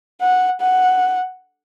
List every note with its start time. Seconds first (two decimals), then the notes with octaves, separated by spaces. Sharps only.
0.21 F#5
0.61 F#5